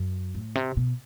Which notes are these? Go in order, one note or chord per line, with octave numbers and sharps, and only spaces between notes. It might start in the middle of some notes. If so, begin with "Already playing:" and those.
Already playing: F#2
A2
C3
B2